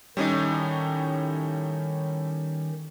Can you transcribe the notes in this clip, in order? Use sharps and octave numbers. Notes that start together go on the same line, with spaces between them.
A2 D#3 G3 C#4 D#4